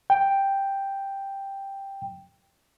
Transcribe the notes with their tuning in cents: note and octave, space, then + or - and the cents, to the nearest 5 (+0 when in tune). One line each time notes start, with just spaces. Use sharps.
G5 +5